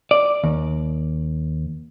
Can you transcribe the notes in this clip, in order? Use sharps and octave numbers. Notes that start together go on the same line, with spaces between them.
D5
D#2